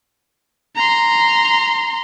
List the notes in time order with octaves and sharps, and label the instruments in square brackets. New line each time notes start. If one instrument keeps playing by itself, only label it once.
[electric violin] A#5 C6